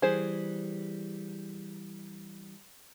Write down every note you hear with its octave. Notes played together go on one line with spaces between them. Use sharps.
E3 G3 G#4 C5